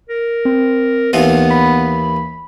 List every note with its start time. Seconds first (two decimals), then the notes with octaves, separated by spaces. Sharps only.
0.09 A#4
0.45 C4
1.13 D#2 E3 B3 F4
1.51 B5